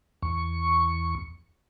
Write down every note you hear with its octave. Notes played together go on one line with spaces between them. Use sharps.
E2 C#6